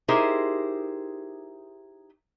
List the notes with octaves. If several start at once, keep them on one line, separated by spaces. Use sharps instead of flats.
D#4 E4 G4 G#4 A#4 C5